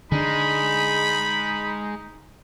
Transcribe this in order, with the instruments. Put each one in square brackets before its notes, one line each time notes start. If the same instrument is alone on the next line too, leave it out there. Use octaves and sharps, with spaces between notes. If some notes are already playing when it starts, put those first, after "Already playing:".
[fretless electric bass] D3 D4 [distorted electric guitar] G#3 [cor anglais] D#4 [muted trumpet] B5